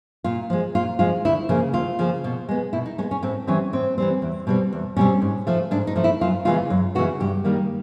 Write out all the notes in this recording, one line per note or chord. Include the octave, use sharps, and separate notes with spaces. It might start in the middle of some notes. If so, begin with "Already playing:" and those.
A#2 F4
F3 G#3
A#2 F4
F3 G#3 F4
D2 E4
C#3 F3 A#3
D2 F4
C#3 F3 A#3
B2
G#3 B3
B2 E4
D#4
G#3 B3 C#4
C#4
A2 C4
E3 G3 C4 C#4
A2 C4
E3 G3 C4
E2
B2 G3 C4
E2
B2 G3 C4 C#4
G#2
F3 A3
G#2 D4
D#4
F3 A3
E4
F#2 F4
C#3 E3 G#3 B3 F4
F#2
C#3 E3 G#3 B3 F#4
G2 G4
D#3 G3 A#3